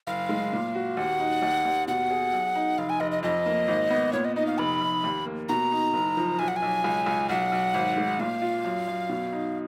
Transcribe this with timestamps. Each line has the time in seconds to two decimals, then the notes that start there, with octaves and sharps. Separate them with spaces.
0.07 F#1 F5
0.29 G#3
0.53 A#2
0.75 F#4
0.97 D#2 F#5
1.20 D#4
1.42 D#2
1.65 D#2
1.88 B2 F#5
2.11 G#4
2.33 B1
2.55 D#4
2.78 F1 F5
2.89 G#5
3.00 F1 D#5
3.11 D#5
3.23 F2 D#5
3.46 A#3
3.68 G#1
3.90 B3
4.13 A#2 C#5
4.25 D#5
4.36 D#4 D#5
4.47 F5
4.58 F1 B5
4.81 F1
5.04 D#2
5.26 A#3
5.49 B2 A#5
5.72 D#4
5.93 F#1
6.17 F3
6.39 B1 G#5
6.48 F#5
6.56 G#5
6.62 B1
6.84 C#2
7.06 C#2
7.29 B1 F#5
7.52 B1
7.74 G#1
7.97 G#3
8.19 A#2 F5
8.42 F4
8.64 F#2
8.87 F#2
9.09 B2
9.33 D#4